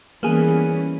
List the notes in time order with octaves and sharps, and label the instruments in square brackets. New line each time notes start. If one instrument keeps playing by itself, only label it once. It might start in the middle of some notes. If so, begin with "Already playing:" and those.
[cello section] E3 G3 C#4 [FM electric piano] A#3 B3 G#4